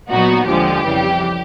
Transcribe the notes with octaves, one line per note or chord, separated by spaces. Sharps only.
A#2 F#3 B3 D#4 F#4
D#2 D3 F3 G#3 G4
F2 C#3 E3 G3